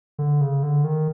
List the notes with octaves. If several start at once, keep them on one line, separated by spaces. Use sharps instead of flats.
D3
C#3
D3
D#3